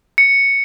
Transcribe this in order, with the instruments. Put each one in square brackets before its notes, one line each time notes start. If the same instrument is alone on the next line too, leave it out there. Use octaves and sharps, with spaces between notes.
[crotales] C#7